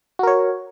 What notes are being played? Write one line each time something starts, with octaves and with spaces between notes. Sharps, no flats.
F#4 A#4 C#5